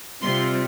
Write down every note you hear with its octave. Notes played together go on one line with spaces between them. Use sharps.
C3 G3 C4 F4 C6